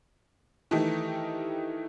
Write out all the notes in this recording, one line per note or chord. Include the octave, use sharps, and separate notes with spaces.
D#3 E3 A3 D#4 G4